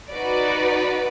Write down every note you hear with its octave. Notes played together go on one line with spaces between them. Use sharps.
D#4 F#4 B4 D5